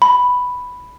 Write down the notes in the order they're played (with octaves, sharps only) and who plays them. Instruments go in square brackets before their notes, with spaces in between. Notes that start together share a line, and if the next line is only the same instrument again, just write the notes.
[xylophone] B5